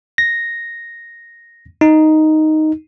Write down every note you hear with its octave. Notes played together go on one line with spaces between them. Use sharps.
A#6
D#4